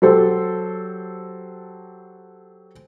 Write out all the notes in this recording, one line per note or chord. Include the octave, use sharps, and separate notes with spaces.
F#3 G4 A4 C5